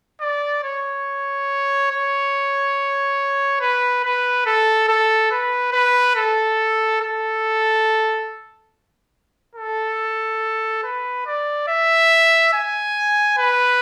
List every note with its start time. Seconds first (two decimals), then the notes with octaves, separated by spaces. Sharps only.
0.21 D5
0.63 C#5
1.91 C#5
3.60 B4
4.04 B4
4.46 A4
4.88 A4
5.31 B4
5.73 B4
6.16 A4
7.01 A4
9.55 A4
10.83 B4
11.26 D5
11.68 E5
12.53 G#5
13.38 B4